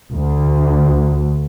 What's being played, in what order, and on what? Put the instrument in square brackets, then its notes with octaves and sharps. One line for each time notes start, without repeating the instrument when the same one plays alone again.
[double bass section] D2